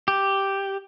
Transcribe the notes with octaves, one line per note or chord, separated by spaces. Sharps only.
G4